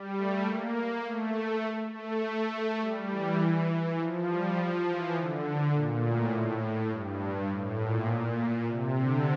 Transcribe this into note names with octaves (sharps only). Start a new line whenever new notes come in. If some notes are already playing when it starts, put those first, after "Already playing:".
Already playing: G3
A3
A#3
A3
A3
G3
E3
E3
F3
G3
F3
E3
D3
A#2
A2
A2
G2
A2
A#2
C3
D3